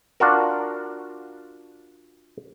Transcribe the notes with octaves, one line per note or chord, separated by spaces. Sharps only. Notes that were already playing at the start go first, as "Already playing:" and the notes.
D4 F4 F#4 A#4